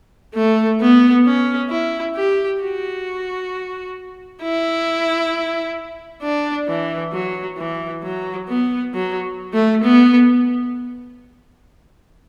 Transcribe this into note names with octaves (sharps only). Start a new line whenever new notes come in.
A3
B3
C#4
E4
G4
F#4
E4
D4
E3
F#3
E3
F#3
B3
F#3
A3
B3